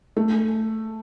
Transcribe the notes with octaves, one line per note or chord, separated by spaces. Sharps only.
A3